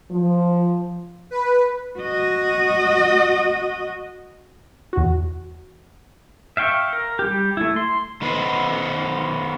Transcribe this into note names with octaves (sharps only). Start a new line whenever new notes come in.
F3
B4
F#4 D#5
E2 F#4
E5 F5 G5 C#6
A#4
G3 G4
A3 E4
C6
D#3 B3 B4 C5